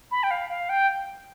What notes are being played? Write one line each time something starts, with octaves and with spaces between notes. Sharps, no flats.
B5
G5
F5
F5
G5